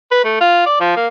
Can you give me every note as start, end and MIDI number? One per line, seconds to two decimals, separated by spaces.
0.11 0.24 71
0.24 0.38 57
0.41 0.62 65
0.66 0.77 74
0.80 0.94 53
0.96 1.07 58